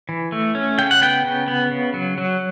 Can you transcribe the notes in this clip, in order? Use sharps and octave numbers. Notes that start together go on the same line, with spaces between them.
E3
A3
C#4
C#3 G5
F#5
B3 G5
C#3
B3
C#3
F#3
F#3